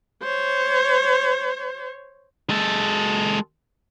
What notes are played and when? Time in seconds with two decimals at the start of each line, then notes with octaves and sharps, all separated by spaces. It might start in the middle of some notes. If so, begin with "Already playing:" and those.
0.22 C5 C#5
2.50 G#3 A4